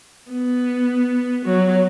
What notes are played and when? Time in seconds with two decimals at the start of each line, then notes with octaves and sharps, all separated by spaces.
0.31 B3
1.45 F#3